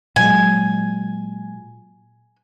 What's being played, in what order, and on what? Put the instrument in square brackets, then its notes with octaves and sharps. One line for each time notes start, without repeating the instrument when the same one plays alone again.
[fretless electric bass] A#2 F#3 G#3 [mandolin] G#5